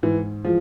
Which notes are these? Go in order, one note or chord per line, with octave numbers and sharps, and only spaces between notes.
G#2 E3
E3 F3 G#3